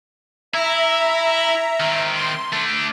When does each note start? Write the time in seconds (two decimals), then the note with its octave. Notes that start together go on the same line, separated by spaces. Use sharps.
0.54 E4 E5 A#5
1.80 D#3 C4
2.16 C6
2.53 A3 D4